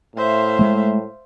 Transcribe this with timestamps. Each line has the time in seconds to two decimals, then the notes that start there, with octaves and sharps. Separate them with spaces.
0.16 A2 C5 E5 F5
0.59 G#3 A3